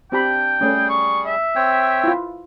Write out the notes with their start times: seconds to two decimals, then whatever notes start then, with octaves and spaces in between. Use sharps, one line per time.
0.12 C4 D4 G4 G5 B5
0.61 G3 A3 C#4 G#4
0.90 C#6
1.26 E5
1.56 C4 C#5 G5
2.04 E4 F4